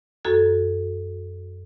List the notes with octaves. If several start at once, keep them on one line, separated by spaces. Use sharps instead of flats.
F#2 F#4 A4 G#6